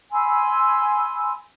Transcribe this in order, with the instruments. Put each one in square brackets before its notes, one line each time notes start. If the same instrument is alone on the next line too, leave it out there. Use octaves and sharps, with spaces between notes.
[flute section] G#5 B5 C6 E6